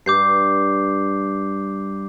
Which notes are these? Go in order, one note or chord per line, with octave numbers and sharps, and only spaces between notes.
G2 D6 G6 C7